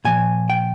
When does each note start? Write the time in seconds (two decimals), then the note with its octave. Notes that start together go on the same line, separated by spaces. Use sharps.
0.05 A#2 F3 G#5
0.50 G5